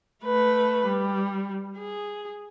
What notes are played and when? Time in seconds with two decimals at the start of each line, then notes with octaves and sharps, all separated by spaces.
0.24 A3 B4
0.86 G3
1.77 G#4